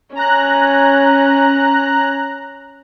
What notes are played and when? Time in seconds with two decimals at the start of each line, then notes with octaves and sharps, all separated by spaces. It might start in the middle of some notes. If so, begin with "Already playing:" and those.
0.15 C#4 A#5 F#6